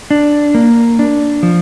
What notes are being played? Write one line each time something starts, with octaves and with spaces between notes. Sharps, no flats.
D4
A#3
D4
F3